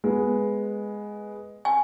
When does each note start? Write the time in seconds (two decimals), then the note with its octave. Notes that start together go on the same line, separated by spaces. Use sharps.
0.04 G#3 B3
1.65 G#5